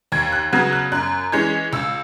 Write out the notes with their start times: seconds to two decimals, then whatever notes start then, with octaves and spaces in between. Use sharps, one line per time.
0.12 D#2 G#6
0.32 F#6
0.52 C#3 F#3 B3 G#6
0.73 F#6
0.92 F#2 F#6
1.32 E3 G#3 C#4 G#6
1.73 C#2 E6